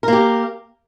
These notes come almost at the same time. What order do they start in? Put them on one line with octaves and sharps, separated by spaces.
A#4 A#3 G4